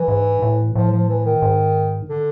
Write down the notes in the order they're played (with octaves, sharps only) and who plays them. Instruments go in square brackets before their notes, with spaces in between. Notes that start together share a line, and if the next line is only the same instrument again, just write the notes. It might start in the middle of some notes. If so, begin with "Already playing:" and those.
Already playing: [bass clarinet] E3
[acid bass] G#2
A2
[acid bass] A2 [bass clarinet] F3
[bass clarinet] F3
E3
D#3
[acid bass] G#2
[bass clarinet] D3